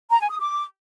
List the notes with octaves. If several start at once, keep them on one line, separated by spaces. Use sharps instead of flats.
A#5
G#5
D#6
D6